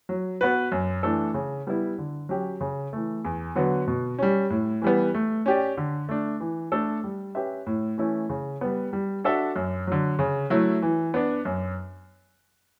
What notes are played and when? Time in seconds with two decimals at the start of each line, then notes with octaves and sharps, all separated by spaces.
0.09 F#3
0.41 B3 F#4 B4
0.72 F#2
1.03 E3 A3 D4 A4
1.34 C#3
1.67 G3 B3 E4
1.98 D3
2.29 F#3 C#4 G4
2.61 C#3
2.93 E3 A3
3.25 E2
3.55 D3 F#3 B3 F#4
3.88 B2
4.19 G3 C#4
4.50 A2
4.82 E3 G3 B3
5.14 A3
5.46 C#4 G4 D5
5.77 D3
6.09 A3 D4
6.40 E3
6.72 A3 D4 A4
7.04 G3
7.35 C#4 G4 B4 E5
7.67 A2
7.98 E3 A3 C#4 E4
8.30 C#3
8.61 G3 B3
8.93 G3
9.24 D4 F#4 A4 E5
9.56 F#2
9.87 D3 F#3
10.19 C#3
10.50 F#3 A3 E4
10.82 E3
11.14 B3 D4
11.45 F#2